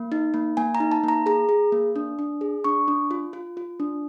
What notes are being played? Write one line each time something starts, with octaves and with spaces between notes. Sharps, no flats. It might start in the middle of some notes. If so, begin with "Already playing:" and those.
Already playing: A#3
D#4
A#3
A#3 G#5
A#5
D#4
A5
A#3 A#5
G#4 A#5
G#4
A#3
D4
D4
G#4
D4 C#6
D4
F4
F4
F4
D4